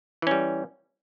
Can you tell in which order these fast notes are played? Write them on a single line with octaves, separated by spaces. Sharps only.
E3 C#4 G3